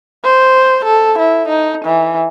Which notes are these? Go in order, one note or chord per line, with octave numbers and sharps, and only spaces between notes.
C5
A4
E4
D#4
E3